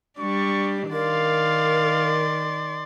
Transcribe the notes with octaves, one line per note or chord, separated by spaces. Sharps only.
G3 D4 C#6
D#3 A#4 D5 F5 C6